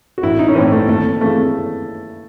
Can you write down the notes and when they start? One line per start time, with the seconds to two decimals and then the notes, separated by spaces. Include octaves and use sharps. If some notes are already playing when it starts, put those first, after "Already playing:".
0.18 F#4
0.23 A1 E4
0.39 D#4
0.48 C#4
0.55 A2 E3 C4
0.72 A3
0.88 D#2 A3
1.21 C#3 E3 A3